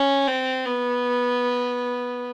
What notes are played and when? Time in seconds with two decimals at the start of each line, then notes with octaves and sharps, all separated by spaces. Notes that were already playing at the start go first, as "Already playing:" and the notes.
Already playing: C#4
0.28 C4
0.66 B3